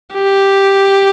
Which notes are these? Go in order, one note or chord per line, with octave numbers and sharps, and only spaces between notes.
G4